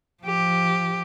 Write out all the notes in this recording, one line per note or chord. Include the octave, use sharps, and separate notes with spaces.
F3 G4